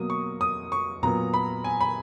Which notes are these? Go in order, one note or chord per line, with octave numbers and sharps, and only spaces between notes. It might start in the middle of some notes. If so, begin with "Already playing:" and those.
Already playing: B2 F#3 A#3 D#6
C#6
D#6
C#6
A#2 F#3 B3 A#5
B5
G#5
B5